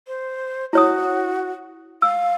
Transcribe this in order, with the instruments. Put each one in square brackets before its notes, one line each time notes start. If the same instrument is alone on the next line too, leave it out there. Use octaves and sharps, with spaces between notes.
[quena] C5
[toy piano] E4 C#5 D#6 [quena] F#4
[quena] F5 [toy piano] E6